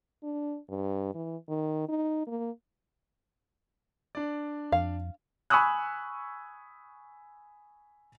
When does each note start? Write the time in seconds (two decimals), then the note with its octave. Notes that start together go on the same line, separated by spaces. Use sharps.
0.23 D4
0.70 G2
1.15 E3
1.49 D#3
1.89 D#4
2.27 A#3
4.15 D4 D5
4.72 F2 F5
5.50 G#5 B5 C#6 D#6 E6 F#6